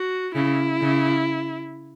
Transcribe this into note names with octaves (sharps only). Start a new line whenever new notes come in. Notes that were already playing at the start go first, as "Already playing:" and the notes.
Already playing: F#4
C#3 E4
C#3